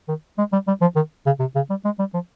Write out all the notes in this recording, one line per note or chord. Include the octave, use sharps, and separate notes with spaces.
D#3
G#3
G3
G3
F3
D#3
C#3
C3
C#3
G3
G#3
G3
F3